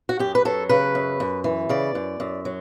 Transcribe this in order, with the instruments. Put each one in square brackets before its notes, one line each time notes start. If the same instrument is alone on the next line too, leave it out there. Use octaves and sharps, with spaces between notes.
[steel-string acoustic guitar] F#4
F#2 G4
B4
F#3 A4
C#3 B4
F#2
F#2
E3
C#3 D5
F#2
F#2
F#3